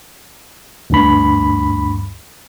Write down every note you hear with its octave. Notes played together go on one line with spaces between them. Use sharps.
D2 G2 B5